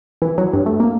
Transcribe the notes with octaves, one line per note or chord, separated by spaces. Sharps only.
E3
F#3
G2
A3
A#3